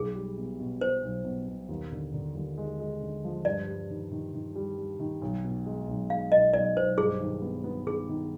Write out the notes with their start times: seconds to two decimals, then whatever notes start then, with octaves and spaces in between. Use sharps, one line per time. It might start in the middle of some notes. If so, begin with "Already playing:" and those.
Already playing: B1 G#4
0.15 G3
0.38 B2
0.60 B2
0.81 B2 C5
1.03 B1
1.25 B2
1.47 B2
1.69 D#2
1.92 D3
2.14 D3
2.35 D#2
2.58 G#3
2.80 G#3
3.01 D3
3.24 F3
3.45 G2 D5
3.68 G3
3.90 D#3
4.11 D#3
4.34 D#3
4.55 G3
4.78 G3
4.99 D#3
5.22 B1
5.44 B2
5.66 G#3
5.87 B1
6.10 G#3 F5
6.32 B1 D#5
6.54 B1 D5
6.77 B1 C5
6.98 G2 G#4
7.21 D#3
7.42 B3
7.64 B3
7.86 D#3 G#4
8.09 D#3